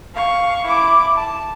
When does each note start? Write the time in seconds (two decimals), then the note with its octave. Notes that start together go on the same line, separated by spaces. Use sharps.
0.15 F5 C#6
0.65 E4 D6
1.16 A5